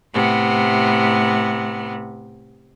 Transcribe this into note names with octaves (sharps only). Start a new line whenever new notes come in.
A2 C3 B3